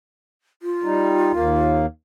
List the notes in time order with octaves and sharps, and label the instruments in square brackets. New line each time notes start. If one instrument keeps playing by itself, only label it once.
[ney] F4
[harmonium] G3 D#4
D#2 A#3